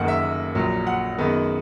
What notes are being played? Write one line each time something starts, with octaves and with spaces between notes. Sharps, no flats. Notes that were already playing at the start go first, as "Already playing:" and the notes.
Already playing: F#1 F#2 D#3 A#3 F#5
E5
A#1 A#2 F#3
F#5
F#2 D#3 G#3 B3